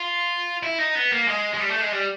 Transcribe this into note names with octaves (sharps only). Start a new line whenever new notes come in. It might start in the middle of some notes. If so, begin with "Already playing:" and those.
Already playing: F4
E4
D#4
B3
A#3
G#3
G#3
G3
A3
G#3
G3